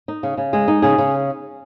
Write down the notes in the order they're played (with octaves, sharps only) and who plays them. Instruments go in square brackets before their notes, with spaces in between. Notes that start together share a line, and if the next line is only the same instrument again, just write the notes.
[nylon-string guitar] D#4
C#3
C#3
G#3 G#4
D#4
C#3 G#4
C#3